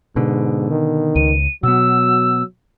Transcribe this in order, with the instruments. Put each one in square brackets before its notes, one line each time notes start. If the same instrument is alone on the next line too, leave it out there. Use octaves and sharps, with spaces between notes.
[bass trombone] G#2 [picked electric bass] B2 D3
[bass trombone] D#3
[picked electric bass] C#2 [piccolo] D#7
[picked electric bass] B2 B3 [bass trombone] F#3 [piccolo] E6